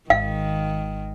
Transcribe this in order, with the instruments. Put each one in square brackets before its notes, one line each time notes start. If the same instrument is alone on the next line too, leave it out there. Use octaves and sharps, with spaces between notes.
[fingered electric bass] G#1 G#2 [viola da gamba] D#3 [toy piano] F5